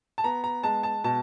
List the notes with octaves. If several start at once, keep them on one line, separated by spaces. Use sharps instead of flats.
A5
B3 A#5
A#5
G#3 A5
A5
B2 A5